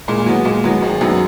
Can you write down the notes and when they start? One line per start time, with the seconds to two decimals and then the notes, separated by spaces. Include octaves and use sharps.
0.08 A#2 G#3
0.26 F#3 B3
0.45 A#2 G#3
0.64 F#3 G#3 B3
0.82 G#1 G#3
1.01 F#2 D#3 F#3 B3